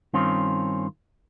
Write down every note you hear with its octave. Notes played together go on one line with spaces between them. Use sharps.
G2 D#3 C4 C#4 F4